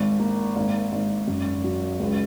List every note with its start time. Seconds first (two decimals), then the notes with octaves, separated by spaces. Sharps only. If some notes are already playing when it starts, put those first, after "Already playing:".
Already playing: G#1 G#2
0.20 A#3
0.56 G#1
0.92 G#1
1.28 F#2
1.64 F#3
2.00 C#2